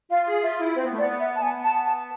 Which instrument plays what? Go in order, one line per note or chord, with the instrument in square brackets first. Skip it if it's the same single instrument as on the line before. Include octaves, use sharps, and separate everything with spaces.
[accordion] F4 [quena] F5
[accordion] G#4
[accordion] F4 [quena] E5
[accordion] E4
[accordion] C4 [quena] C5
[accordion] B3
A3
[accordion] B3 [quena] D5
[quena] E5
A5
[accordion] B3 [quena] G#5
[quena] A5
A5